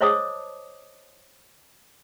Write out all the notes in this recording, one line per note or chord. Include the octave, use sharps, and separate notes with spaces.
C5 C#5 D#5 A5 D6 D#6